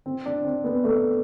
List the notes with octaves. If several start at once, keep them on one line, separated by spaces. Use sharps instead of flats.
C4
D4
C4
B3
A3